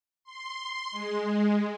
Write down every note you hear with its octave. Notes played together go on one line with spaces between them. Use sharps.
C6
G#3